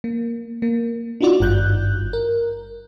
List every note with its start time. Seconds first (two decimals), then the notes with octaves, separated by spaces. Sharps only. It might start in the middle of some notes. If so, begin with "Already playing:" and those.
0.04 A#3
0.62 A#3
1.21 D4 D#4 F4 F#4 D5
1.40 G#1 G2 F#6 G6
2.13 A#4